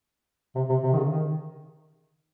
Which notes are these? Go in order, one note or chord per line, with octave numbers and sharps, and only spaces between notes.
C3
C3
C3
D#3
C#3
D#3